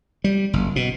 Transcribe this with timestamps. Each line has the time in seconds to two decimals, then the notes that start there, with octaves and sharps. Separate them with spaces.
0.24 G3
0.53 F#1
0.76 B2